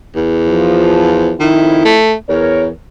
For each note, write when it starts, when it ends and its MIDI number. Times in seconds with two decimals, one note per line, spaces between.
0.15 1.34 40
0.47 1.31 53
1.40 1.97 41
1.40 1.84 51
1.40 1.97 64
1.85 2.14 57
2.29 2.69 40
2.29 2.65 70
2.29 2.65 73